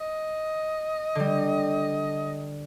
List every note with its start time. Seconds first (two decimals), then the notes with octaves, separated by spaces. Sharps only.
0.01 D#5
1.15 D3 G3